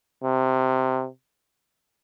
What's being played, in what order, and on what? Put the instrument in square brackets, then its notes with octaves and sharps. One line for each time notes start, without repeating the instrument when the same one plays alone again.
[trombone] C3